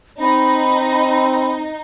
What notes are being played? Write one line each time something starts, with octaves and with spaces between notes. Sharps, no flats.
C4 D#4 B5